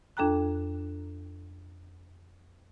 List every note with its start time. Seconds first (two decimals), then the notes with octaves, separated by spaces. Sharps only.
0.17 F2 D4 A4 G5 A#5 F#6